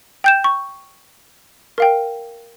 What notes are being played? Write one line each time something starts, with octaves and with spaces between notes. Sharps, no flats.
G5 G6 E7
C#6
A#4 F5 G5